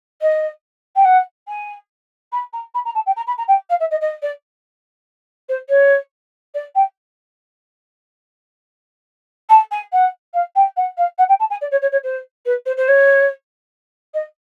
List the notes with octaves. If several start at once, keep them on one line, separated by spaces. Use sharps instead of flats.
D#5
G5
F#5
G#5
B5
A#5
B5
A#5
A5
G5
A#5
B5
A#5
G5
F5
E5
D#5
D#5
D5
C5
C#5
D5
G5
A5
G#5
F#5
F5
G5
F#5
F5
F#5
G5
A5
G#5
D5
C#5
C#5
C#5
C5
B4
C5
C5
C#5
D#5